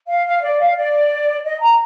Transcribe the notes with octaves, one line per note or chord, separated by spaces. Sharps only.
F5
F5
D5
F5
D5
D#5
A#5